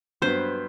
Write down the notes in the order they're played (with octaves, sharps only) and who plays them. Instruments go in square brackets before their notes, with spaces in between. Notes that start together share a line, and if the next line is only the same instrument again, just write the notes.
[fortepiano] G2 F#3 B3 [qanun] C5